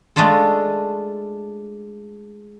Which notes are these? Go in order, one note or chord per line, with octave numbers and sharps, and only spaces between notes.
G#3 A3 D4 F4 A4